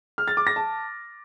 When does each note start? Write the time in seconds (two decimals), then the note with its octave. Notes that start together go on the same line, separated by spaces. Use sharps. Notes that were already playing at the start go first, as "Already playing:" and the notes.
0.18 F6
0.28 A6
0.37 D6
0.47 A#6
0.56 A5